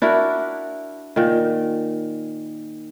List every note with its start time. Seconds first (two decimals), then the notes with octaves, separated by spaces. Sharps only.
0.02 D4 E4 F#4 A#4
1.16 A#2 D#3